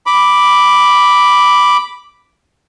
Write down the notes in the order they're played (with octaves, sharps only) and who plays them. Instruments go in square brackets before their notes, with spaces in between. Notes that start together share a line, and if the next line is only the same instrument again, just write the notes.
[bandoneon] B5 D6